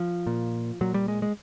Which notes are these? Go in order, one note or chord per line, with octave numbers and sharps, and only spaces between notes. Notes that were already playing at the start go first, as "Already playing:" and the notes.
Already playing: F3
A#2
A#2 F#3
G3
G#3
G#3